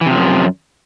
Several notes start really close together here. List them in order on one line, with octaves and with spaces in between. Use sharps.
E3 C3 F3 F#2